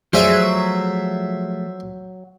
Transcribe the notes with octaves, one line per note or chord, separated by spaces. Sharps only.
F3 F#3 A3 G#4 C5 D5 E5 G#5